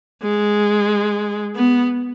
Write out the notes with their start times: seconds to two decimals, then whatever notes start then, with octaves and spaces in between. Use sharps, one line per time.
0.22 G#3
1.56 B3